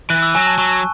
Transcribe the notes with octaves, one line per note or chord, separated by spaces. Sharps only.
E3 F#6
E6
F#3 G#5
A5
F#3 C#6